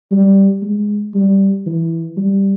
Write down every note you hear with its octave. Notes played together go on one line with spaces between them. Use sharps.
G3
G#3
G3
E3
G3